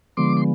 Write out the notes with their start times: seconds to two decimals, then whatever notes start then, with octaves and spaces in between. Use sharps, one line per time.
0.17 D3 F3 G#3 B3 C6 D6
0.37 C6